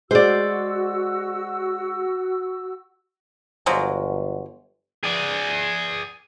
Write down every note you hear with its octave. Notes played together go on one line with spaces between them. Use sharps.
G#3 F#4 C5 D5 E6
G1 F3 F#3 G#3
G#4 D5